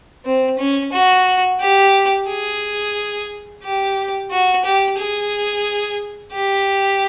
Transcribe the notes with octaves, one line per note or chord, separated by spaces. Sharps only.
C4
C#4
F#4
G4
G#4
G4
F#4
G4
G#4
G4